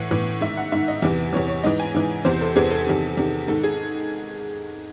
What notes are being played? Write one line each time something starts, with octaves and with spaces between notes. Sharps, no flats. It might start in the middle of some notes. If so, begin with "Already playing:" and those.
Already playing: A2 E3 F#5
A2 E3
G#2 D#3 E5
F#5
G#2 D#3 E5
D#5
E2 C3 E3
E2 C3 E3 C#5
C#5
G#2 E3 D#5
G#5
G#2 E3
E2 C3 E3 C5
A4
E2 C3 E3 G#4
A4
E2 C3 D#3
E2 C3 D#3
G#2 D#3 A4
G#4